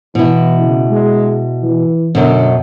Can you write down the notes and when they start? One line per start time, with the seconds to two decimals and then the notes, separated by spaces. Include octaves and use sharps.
0.15 B2 E3 E4
0.61 C#3
0.91 G#3
1.63 E3
2.15 F#2 B2 D3